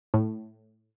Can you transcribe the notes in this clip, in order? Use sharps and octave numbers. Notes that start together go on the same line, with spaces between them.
A2